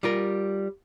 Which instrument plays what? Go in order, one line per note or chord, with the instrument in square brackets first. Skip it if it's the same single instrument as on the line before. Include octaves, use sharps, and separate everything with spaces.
[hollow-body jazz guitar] G3 F4 A#4